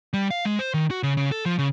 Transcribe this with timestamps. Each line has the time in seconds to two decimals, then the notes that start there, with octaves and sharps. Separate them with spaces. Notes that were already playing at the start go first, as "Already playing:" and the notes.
0.13 G3
0.31 F5
0.45 G#3
0.59 C5
0.74 D#3
0.91 F#4
1.03 C#3
1.17 C#3
1.32 A4
1.45 F3
1.59 C#3